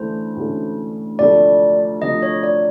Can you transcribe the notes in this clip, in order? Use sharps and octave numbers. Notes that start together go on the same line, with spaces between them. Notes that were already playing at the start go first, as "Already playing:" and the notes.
Already playing: D2 E3 A3 C#4 C5
D2 C3 E3 A3 C#4
D2 C3 F3 A3 D5
D2 C3 F3 A3 D#5
C#5
D5